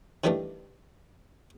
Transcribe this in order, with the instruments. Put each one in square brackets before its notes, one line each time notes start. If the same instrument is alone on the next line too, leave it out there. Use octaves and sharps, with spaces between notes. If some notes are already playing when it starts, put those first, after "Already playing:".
[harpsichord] D#3 E3 G3 A3 D4